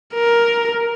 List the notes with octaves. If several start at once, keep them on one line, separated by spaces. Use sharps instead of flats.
A#4